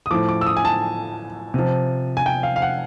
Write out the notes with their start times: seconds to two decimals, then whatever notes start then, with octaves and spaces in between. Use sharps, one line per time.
0.06 D#6
0.11 A2 F3 D6
0.29 D6
0.41 E6
0.46 D#6
0.57 G#5
0.65 A5
1.54 C3 F3
2.17 G#5
2.26 G5
2.43 F5
2.56 F5
2.62 F#5